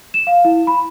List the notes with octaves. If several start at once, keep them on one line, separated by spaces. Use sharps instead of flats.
E7
F5
E4
B5